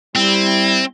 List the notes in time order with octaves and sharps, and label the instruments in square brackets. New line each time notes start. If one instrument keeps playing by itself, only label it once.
[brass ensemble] G3 E4 [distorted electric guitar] C4